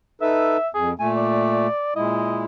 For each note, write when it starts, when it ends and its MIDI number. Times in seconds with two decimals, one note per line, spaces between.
0.21 0.57 63
0.21 0.57 69
0.21 0.57 71
0.21 0.68 76
0.74 0.93 41
0.74 0.90 68
0.99 1.67 46
0.99 1.67 57
0.99 1.10 80
1.16 1.95 74
1.96 2.45 46
1.96 2.45 56
1.96 2.45 64
1.96 2.43 75